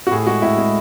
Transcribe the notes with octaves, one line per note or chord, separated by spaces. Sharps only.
F#4
A2 G#4
G#3 F#4
A2 E4
G#3